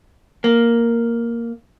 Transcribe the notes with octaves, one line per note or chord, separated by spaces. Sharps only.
A#3